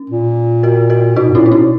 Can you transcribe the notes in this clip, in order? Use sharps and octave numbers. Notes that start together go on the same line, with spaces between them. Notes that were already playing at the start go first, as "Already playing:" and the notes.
Already playing: C#4
A#2
F#4 A#4
F#4 A#4
B2 D#4 F#4
G#2
A#2 C#4 E4
D#4
B2 C#4 E4